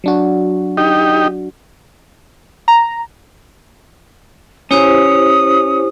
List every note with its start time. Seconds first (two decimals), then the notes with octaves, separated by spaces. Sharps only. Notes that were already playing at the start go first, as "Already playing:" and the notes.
0.04 F#3 D4 F#4
0.77 D#4 G4
2.68 A#5
4.71 C#4 E4 G4 C5 D#6